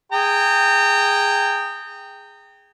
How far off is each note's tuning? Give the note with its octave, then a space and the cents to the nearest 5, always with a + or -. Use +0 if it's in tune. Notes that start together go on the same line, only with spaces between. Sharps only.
G#4 -15 G5 +0 A#5 -35